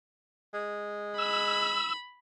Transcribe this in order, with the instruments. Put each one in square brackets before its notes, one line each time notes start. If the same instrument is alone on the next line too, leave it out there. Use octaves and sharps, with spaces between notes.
[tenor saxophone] G#3
[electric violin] B5 [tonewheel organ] E6